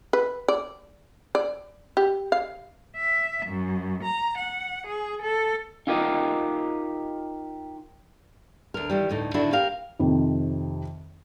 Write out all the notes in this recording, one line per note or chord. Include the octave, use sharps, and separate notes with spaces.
B4
D5
D5
G4
F5
E5
F#2
A#5
F#5
G#4
A4
D#4 F4 G4 A#4 D#5
D2 A#4
D#3 E3 G3
D2 A2 D#4
A2 D3 D#3 D4 E4 F#4
G4 A#4 F5
F2 C3 D#3